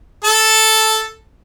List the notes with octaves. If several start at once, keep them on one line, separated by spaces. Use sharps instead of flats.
A4 A5